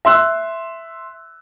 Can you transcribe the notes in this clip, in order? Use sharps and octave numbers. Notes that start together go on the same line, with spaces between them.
E5 C6 E6 F#6